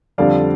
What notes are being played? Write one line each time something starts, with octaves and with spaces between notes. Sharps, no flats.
F2 D3 G3 D5 F5